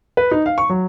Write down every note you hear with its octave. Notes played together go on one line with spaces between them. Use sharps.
B4
D#4
F5
C#6
F#3